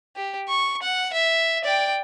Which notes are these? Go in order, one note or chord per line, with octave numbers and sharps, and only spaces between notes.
G4
C#6
F#5
E5
D5 G5